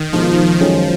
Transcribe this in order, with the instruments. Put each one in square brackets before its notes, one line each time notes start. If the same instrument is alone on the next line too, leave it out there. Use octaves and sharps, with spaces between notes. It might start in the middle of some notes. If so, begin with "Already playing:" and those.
Already playing: [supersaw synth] D#3
[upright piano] B2 G#3 D#4 [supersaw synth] F3
[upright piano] F#2 D#3 G#3 C#4 [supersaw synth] F3